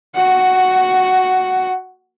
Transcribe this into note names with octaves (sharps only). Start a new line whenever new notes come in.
F#4 F#5